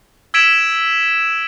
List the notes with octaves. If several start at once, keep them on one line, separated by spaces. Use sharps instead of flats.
E6 G#6 B6 D7 E7 F#7